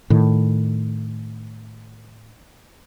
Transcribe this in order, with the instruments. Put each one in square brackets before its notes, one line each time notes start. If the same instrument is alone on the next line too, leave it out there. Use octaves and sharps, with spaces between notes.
[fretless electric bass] A2 D#3